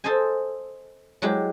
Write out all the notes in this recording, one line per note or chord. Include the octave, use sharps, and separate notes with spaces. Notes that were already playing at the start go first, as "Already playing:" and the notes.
A4 C5 D#5 G#5
F#3 G#3 E4 G4